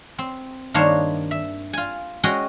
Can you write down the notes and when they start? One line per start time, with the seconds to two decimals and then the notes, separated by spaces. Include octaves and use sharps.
0.19 C4
0.74 G2 D#3 A#3 D4 C5 C#5
1.31 E5
1.73 F4 G#5
2.24 G#3 C#4 F#4 D#5 G5